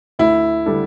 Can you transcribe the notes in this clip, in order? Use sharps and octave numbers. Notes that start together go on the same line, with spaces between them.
D2 E4
D3 G3 D4 A4